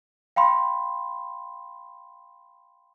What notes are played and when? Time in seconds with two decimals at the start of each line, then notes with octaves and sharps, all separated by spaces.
0.36 F5 G5 B5 C6